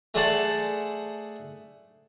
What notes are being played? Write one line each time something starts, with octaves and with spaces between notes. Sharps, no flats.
A3 G#4 C5 D5 F#5 A5